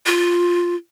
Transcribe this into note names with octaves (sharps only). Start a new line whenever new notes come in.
F4